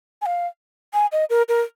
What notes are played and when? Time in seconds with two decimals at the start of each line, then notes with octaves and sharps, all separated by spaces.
0.22 G#5
0.26 F5
0.94 G#5
1.12 D#5
1.30 A#4
1.49 A#4